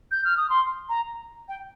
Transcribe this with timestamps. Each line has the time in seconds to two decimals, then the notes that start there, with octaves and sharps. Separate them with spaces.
0.11 G6
0.25 F6
0.37 D#6
0.50 C6
0.89 A#5
1.49 G5